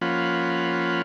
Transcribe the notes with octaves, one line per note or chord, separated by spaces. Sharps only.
F3 A#3 C#4 F4 F#5 B5